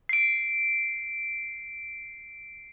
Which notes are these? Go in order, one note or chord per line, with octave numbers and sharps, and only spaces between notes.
C7 D7